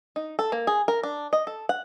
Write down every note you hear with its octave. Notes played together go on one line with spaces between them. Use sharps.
D#4
A4
A#3
G#4
A#4
D4
D#5
A4
F#5